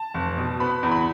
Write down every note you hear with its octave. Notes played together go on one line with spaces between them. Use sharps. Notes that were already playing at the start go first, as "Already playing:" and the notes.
Already playing: A5
F1
B2
B3 B5
E2
B5